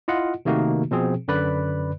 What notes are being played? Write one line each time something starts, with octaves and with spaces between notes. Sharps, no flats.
E4 F4 D#5 F#5
C3 D#3 A3 A#3 D#4 F#4
B2 F3 C4 G#4
F#2 D3 B4 D5 B5 F#6